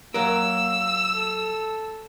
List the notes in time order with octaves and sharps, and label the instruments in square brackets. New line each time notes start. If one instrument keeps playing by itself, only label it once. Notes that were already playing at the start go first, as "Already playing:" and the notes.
[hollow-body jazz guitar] F#3 A#4 [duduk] A#3 [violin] E6
[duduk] A4